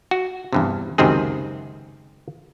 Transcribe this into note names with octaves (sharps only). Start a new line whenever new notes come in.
F#4
E2 G2 C3
C#2 F#2 C3 D#3 C4 G#4